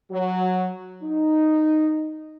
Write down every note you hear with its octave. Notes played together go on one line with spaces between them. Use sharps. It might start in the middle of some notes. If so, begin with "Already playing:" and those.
F#3
D#4